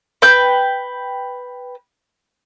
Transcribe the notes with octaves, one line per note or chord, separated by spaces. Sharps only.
B4 G5 G6